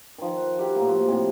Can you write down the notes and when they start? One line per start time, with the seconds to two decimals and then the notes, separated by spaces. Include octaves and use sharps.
0.18 D#3 F3
0.37 F#5
0.59 E4 F#4 G4 A#4
0.76 A2 A#3
0.89 F3
1.08 A2 C3 E4 F#5